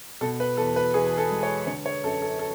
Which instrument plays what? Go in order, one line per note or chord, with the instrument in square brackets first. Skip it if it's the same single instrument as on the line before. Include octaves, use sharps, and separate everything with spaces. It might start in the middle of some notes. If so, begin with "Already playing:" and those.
[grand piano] B2 A4
B4
E2 A4
B4
E2 G#4
A4
G#3
C#5
D3 C#5
C#5
F#2 A4
A4
A4